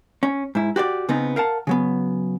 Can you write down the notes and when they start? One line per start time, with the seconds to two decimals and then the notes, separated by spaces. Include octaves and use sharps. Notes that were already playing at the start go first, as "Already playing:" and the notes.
0.23 C#4
0.55 G#2 E4
0.76 F#4 G4 C5 D5
1.09 C#3 B3 C4 D#4
1.36 A#4 F5 F#5 A5
1.67 C#3 F#3 B3